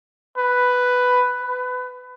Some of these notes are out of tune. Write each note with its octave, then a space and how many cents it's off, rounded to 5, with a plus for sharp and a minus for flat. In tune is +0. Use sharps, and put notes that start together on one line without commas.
B4 +5
B4 +25